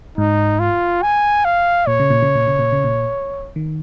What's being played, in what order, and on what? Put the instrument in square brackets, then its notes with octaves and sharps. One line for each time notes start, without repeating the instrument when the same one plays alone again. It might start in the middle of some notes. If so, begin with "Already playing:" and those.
[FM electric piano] G#2 [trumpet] D#4
[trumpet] F4
G#5
F5
[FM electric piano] A#2 [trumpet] C#5
[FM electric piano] C#3
A#2
C#3
A#2
C#3
A#2
C#3
A#2
D#3